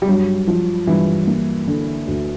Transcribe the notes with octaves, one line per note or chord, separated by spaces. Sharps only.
G3
G2 F#3
F3
G2 E3
A#3
D3
D2